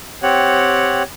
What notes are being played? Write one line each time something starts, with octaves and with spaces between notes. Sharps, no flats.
C4 G4 C#5 F#5